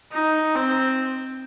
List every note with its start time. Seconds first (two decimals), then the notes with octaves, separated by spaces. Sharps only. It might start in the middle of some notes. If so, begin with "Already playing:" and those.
0.13 D#4
0.56 C4